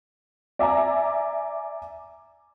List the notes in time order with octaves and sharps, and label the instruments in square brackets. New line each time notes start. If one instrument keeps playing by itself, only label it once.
[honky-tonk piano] D5 E5 G#5 A#5 D6